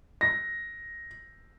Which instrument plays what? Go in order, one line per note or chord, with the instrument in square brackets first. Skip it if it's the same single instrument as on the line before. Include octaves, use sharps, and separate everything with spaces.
[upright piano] A#6